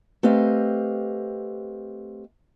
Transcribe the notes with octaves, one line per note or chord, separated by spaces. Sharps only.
A3 C4 G4 B4 D#5 F5